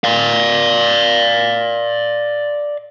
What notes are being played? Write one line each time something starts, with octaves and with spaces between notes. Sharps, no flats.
D5 F5